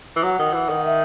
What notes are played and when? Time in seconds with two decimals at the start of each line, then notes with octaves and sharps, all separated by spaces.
0.16 E3
0.23 F#3 F#5
0.39 D#3
0.54 E3
0.69 D#3
0.85 E5